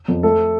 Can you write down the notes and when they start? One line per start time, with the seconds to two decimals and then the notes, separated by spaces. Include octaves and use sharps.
0.08 F2
0.23 A3 A4